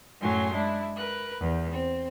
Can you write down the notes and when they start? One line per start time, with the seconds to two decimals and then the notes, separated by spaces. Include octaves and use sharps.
0.21 F#2 A2 F#3 G#5 C6
0.53 G#3 D4 E4
0.96 A#4 B4 F#6
1.40 E2
1.71 C4